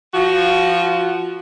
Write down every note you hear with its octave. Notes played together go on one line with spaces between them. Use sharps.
F3 F#4